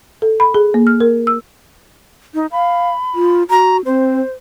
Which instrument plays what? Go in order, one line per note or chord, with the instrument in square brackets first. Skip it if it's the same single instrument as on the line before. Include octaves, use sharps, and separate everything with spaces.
[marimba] A4
B5
G#4
A#3
F6
A#4
E6
[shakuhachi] D#4
[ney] F5 [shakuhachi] B5
[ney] F4
[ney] F#4 [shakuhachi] A#5
[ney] C4 [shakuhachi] C5